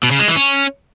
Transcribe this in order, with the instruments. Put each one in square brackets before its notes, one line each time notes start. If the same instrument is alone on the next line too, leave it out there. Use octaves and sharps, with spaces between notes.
[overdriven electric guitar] B2
C#3
G#3
E3
C#4